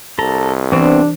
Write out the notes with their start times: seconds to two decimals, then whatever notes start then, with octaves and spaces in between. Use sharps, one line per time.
0.19 C2 A4 A#5
0.72 E3 B3 C4 D4